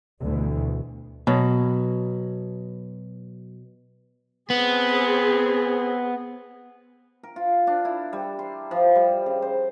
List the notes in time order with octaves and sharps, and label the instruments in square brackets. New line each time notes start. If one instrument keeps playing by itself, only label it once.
[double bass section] D2 B2 E3
[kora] B2 F#3
[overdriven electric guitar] B3 [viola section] C4 G#4
[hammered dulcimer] A#4
F4
D4
E4
G3
C6
F3
G3
C#3
C5